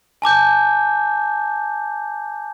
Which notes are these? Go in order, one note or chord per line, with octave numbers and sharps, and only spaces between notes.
G#5 A5 D6 G6